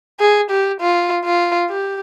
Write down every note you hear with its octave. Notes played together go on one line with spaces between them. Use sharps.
G#4
G4
F4
F4
G4